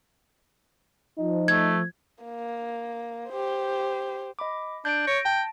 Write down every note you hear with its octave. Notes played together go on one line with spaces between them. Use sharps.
F3 D#4
A3 G#6
A#3
G4 C5
D#5 B5 D6
D4 G6 D7
C#5 A#6 D7
G5 A5